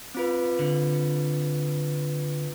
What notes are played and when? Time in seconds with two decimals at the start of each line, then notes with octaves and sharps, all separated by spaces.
0.15 C4 F4 B4
0.59 D3